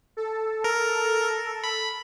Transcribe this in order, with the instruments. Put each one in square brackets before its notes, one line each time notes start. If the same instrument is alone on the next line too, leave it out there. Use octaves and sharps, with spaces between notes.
[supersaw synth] A4
[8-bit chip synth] A#4
B5